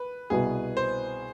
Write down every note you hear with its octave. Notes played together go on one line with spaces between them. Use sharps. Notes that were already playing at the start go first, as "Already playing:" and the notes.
Already playing: B4
C2 B2 B3 G#4
C5